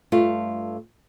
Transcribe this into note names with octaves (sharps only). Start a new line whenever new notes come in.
G2 A3 F4